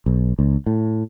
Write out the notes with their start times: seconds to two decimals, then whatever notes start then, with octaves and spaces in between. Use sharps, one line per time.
0.06 B1
0.39 C#2
0.66 A2